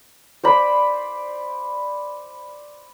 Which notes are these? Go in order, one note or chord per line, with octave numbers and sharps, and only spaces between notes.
C5 D5 B5